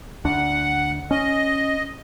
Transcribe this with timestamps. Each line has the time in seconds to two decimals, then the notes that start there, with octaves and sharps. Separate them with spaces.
0.25 D2 D4 F#5
1.11 C#4 D#5